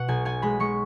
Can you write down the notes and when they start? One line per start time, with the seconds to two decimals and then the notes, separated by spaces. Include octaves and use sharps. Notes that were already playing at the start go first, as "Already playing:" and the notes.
Already playing: B2 F#5
0.08 B1 G#5
0.25 B3 G#5
0.42 G#3 B5
0.60 G#3 C#6